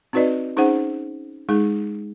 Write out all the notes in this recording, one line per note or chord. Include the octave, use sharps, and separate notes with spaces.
C4 D#4 F#4 B4 D5 D#5
C#4 D#4 G#4 C5 F#5
G#3 D#4 G#4